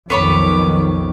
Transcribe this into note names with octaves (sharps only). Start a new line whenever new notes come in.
B1 F2 D#3 B3 C#5 B5 D6